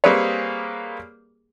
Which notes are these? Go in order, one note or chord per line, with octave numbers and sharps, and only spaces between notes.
G3 A#3 C4 G#4 B4 C#5